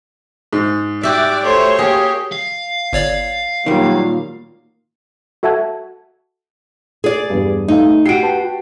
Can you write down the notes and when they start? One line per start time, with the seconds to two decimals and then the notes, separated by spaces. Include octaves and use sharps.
0.53 G#2
1.03 F#4 G4 D5 E5
1.45 A3 C5 C#5
1.79 A#3 G4 G#4
2.32 F5
2.93 G1 C#5 D5
3.66 A#2 D#3 F#3 G3 A#3
5.43 F#4 A4 E5 F#5 A5 G#6
7.04 G#4 D5
7.30 E2 G2
7.68 A3 D#4 F5
8.06 F#4 G4 C7 D7
8.22 B4 G5 A5